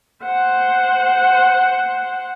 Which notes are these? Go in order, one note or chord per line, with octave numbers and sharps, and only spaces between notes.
C5 F#5